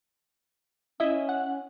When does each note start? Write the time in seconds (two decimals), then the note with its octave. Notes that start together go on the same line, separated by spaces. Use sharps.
1.00 C#4 E4 D#5 E5
1.29 F#5